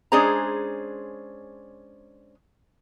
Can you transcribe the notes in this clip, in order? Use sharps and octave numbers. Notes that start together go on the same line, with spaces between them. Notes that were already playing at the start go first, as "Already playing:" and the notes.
G#3 C#4 D4 G#4 C5 A#5